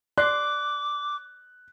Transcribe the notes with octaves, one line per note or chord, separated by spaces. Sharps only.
D5 C6 D6 F#6